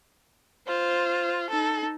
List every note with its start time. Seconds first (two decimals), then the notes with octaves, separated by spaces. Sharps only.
0.67 F4 C5
1.50 D#4 A4